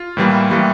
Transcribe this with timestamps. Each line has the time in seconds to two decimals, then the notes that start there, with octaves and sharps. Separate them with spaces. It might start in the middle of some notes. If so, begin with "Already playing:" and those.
Already playing: F4
0.17 A2 E3 G3 A#3
0.51 A2 E3 G3 A#3